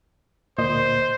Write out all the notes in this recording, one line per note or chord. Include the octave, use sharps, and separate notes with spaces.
D2 A#2 C5 D#5